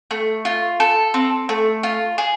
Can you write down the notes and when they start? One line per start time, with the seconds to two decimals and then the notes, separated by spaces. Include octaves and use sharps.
0.11 A3
0.45 F4
0.80 A4
1.14 C4
1.49 A3
1.83 F4
2.18 G#4